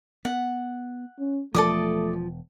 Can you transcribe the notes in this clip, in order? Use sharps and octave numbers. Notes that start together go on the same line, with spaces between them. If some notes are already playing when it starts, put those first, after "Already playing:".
B3 F#5
C#4
E1 F3 A3 A4 D5 D#6